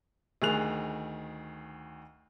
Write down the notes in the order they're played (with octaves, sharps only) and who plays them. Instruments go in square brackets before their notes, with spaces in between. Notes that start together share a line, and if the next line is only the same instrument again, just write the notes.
[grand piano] D2 D#3 G#4 F#6 F7